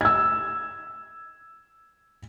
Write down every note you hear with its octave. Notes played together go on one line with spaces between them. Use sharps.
E6 G#6